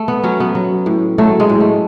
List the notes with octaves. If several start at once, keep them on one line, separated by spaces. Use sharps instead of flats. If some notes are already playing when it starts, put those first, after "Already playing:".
Already playing: A3
B3
F#3 C#4
B3
F#3
A2
F#3 A3
G#3
A2
A3